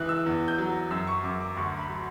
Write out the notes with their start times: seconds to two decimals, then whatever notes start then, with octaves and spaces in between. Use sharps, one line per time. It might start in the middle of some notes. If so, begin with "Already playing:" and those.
Already playing: C#2 E3 F#6
0.09 E6
0.26 E2
0.48 G6
0.58 F#3
0.91 F#2 E6
1.07 C#6
1.24 F#2 D6
1.40 D6
1.56 D2 C#6
1.78 B5
1.89 F#3